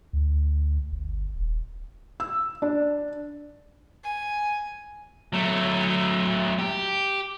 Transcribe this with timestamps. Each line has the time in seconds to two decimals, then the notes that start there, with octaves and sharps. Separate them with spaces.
0.13 D2
0.92 G1
1.36 D#1
2.20 E6
2.62 D4
4.04 G#5
5.33 F#3 A3
6.59 G4